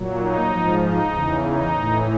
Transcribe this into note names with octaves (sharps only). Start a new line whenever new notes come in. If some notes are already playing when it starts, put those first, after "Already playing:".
Already playing: A#2 F#3
D#4
G#2 F3
D#4
E2 C#3 E3
D#4
A2 E3